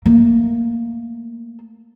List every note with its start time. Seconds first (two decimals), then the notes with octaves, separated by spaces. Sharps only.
0.06 A3 A#3